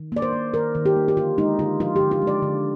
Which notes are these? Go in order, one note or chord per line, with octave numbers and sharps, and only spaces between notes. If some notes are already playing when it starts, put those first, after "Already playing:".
Already playing: D#3
A#3 D5
C5
A#3
D#3 A#4
D#3
G4
A#3
G4
D3 F4
G#3 D#4
D3 F4
F3 F4
G4
D3
F4
G#3
D5
D3